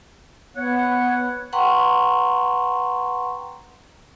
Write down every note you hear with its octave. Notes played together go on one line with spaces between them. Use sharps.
B3 C#5 F#5
B4 F#5 G5 A#5 C6 C#6